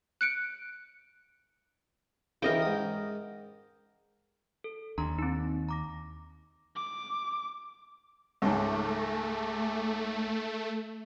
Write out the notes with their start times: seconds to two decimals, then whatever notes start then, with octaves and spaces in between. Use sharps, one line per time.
0.21 F#6 C#7 D7
2.42 C#3 E3 A#4 D#5 G5
2.62 G#2 D#6
4.64 A4
4.98 D#2 D4 A#5 C6
5.18 C4 D#4
5.69 A#5 D6 A#6
6.76 D6
8.42 C#2 G#2 A3